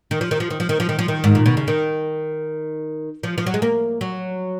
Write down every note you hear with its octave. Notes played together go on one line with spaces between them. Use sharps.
D#3
F3
D#3
F3
D#3
F3
D#3
F3
D#3
F3
D#3
G#2
A#2
B2
C#3
D#3
F3
F3
F#3
G#3
A#3
F#3